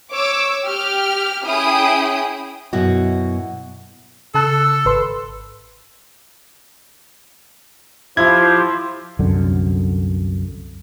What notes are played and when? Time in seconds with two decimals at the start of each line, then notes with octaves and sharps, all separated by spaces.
0.13 C#5 D6 E6
0.66 G4 F6
1.45 C#4 E4 G#4 G5 D#6
2.73 F#2 B2 E4 F#4
4.35 C#3 A4 A5 F#6
4.85 G#1 B4 C6
8.17 F3 E4 F4 G4 C5 G#6
9.19 C2 F#2 D3